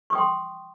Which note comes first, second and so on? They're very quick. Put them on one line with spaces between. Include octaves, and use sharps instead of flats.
C#6 D#6 G5 C6